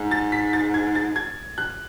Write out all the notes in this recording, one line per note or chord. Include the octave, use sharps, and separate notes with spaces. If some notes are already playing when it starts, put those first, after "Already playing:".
Already playing: G#2
A6
B6
A6
G#6
A6
G#6
F#6